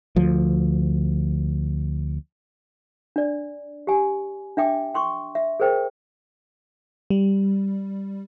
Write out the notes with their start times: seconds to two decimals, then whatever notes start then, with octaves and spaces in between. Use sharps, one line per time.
0.16 D2 F3
3.16 D4 D5
3.87 G4 G#5
4.57 D4 E5 G5 D6
4.94 G5 C6 C#6
5.35 E5
5.60 G#4 A#4 C5 G5
7.10 G3